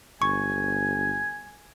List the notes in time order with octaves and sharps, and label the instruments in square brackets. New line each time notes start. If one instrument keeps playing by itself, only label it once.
[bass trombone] G1 [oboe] G#5 [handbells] C#6